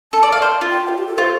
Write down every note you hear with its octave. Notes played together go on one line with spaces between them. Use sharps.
A4 A5
D5
F5
C5
F4
G5
F4
G4
A4
F4 C5